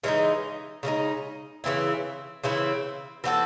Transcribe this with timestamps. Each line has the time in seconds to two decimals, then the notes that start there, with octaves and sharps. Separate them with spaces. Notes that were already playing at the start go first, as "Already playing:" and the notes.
0.04 C#3 E3 G#3 D#4
0.83 C#3 E3 G#3 D#4
1.64 C#3 E3 C4 E4
2.44 C#3 E3 C4 E4
3.24 E3 C4 F#4 A4